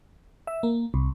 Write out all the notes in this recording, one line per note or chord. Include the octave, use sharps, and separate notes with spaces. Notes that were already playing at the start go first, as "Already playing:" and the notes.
E5
A#3
C2